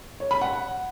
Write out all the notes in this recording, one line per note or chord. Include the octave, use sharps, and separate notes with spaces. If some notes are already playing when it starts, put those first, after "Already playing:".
C#5
B5
F#5